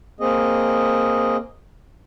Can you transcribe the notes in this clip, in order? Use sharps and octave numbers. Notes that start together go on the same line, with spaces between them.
A#3 C4 G#4 D#5